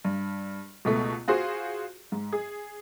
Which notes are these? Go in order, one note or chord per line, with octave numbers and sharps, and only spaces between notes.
G2
C#2 B2 A3
F4 F#4 G#4 C5
G#2
G#4